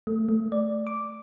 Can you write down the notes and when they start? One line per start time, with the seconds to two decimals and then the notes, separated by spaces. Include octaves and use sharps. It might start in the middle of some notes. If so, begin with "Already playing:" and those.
0.07 A3
0.29 A3
0.52 D5
0.87 D6